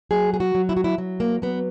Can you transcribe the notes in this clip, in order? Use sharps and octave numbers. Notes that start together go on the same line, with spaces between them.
F#3 G#4
G#4
F#4
F#3
E4
F#4
E4
F#3
A#3
F#3 B3